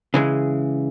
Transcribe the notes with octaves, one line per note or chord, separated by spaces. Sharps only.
C#3 E3 G#3